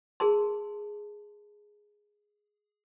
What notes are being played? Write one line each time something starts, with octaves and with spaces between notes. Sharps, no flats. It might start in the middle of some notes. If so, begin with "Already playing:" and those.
G#4 A#4 A5 C6